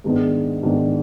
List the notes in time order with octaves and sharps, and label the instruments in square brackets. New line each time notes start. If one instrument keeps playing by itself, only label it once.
[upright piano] G#2 D#3 G#3 B3 D4
G#2 D#3 G#3 B3 D4